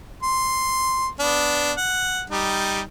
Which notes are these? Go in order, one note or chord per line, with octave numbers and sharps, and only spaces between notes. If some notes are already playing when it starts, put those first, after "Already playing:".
C6
B3 D4
F#5
G3 D#4 G4